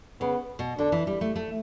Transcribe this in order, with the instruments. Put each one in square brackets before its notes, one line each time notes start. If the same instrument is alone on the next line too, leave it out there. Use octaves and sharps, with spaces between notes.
[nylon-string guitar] C#3 [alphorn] B3
[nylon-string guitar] B2
[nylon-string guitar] D3 [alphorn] D4
[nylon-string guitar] E3
G3
A3
A3